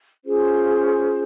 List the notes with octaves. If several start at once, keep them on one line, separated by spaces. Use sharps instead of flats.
C#4 F4 G#4 C5